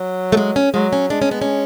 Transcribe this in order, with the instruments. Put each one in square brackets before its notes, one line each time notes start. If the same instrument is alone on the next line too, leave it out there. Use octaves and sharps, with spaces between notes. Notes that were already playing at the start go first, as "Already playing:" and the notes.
Already playing: [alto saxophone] F#3
[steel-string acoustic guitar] A3
G#3
C#4
[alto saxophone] F#3 [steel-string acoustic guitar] G#3
[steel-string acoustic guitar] C#4
[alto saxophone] G#3 [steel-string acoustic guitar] D4
[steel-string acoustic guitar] C#4
B3
C#4